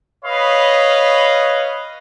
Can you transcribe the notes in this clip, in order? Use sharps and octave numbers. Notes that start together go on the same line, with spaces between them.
B4 C#5 D#5 F5 B5